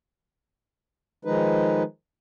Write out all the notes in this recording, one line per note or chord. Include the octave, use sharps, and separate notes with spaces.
D#3 F3 G#3 D#4 B4